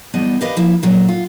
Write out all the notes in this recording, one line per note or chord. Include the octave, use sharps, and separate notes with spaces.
E2 G3 B3 D#5 A5
G4 A#4 B4 D5 D#5 F5
F3 A#3 E4
A#2 F#3 A3 D#4
F4